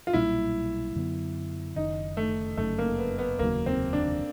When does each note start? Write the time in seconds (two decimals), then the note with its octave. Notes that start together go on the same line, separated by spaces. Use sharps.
0.07 F4
0.13 B1 A#2 G3 A#3 E4
0.96 F#2 D3 F#3 B3
1.76 F#1 F#2 D#3 D#4
2.17 A3
2.57 G1 F#2 C#3 A3
2.78 A#3
2.98 B3
3.18 B3
3.39 F1 D#2 C#3 F#3 A#3
3.66 C4
3.93 D4